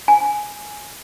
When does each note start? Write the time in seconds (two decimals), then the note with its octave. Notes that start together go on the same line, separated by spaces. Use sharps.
0.08 G#5